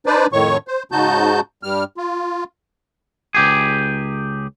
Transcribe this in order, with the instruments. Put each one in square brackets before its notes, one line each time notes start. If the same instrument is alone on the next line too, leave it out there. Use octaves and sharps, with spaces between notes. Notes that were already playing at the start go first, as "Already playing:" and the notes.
[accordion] D4 D#4 B4 C5 D5
F2 A2 D#3 C#5 C#6
C5
G#2 C#3 D#4 F#4 A5 G6
G2 G3 F6
F4
[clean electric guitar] C#2 G4 G#4